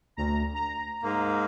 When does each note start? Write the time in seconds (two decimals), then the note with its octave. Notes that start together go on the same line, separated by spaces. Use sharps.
0.17 D2 A#5
0.54 A#5
1.03 G#2 A#3